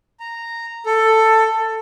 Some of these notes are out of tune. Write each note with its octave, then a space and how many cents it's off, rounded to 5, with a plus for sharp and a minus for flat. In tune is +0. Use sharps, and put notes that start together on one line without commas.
A#5 -10
A4 +10